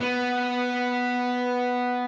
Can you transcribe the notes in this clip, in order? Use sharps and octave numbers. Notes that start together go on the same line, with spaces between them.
B3